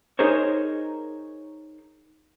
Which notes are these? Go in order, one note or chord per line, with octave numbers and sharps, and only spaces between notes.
D#4 G#4 A#4 C5 C#5